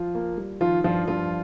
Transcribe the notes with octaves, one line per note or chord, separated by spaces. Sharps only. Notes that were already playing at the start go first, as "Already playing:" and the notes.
Already playing: F3 F4
A#3
G3
D#3 F3 F4
G2 F3 F4
G2 F3 F4